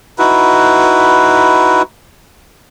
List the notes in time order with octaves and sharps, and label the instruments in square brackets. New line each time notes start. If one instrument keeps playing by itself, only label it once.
[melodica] D#4 E4 F#4 B4